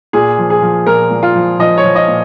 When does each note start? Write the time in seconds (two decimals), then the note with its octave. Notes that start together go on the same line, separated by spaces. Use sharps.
0.13 A#2 G#4
0.38 F3
0.50 G#4
0.62 F3
0.87 A#2 A#4
1.11 A#2
1.23 F4
1.36 F3
1.59 F3 D#5
1.77 C#5
1.84 F3
1.96 D#5
2.08 A#2